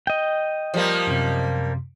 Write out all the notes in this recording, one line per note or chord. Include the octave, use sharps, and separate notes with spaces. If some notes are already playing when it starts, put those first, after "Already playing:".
D#5 G5
F3 G3 A#3
F#2 C3